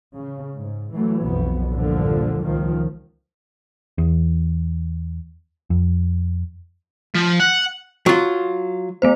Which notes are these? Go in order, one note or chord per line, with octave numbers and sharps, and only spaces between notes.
C#3
G#2
E3 F#3 A3
B1 F2 B3
E2 G2 A#2 D3 F3
C#2 D#3 F3
E2
F2
F3
F#5
F#3 F4
A3 B3 C5